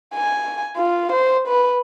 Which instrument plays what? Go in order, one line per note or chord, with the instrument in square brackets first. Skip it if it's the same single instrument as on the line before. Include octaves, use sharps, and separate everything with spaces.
[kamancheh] G#5
F4
C5
B4